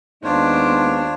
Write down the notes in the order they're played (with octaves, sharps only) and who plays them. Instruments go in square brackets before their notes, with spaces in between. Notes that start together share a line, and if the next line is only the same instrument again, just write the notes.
[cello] D#2 [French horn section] G#3 B3 D#4 [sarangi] D4 [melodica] F4 C5 C#5